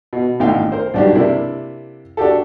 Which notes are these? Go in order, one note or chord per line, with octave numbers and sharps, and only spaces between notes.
B2
G#1 A2 D3 F5 G5
A#4 C5
B1 G2 D4 F#4 G4
C3 A#3 D4 E4
D4 F#4 G4 A4